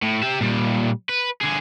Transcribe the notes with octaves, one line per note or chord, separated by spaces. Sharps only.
A2
G4 E5
A#2 G3
B4
D3 G#4